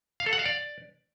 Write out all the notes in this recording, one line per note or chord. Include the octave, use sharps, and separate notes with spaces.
F5
A4
F#5
F5
D5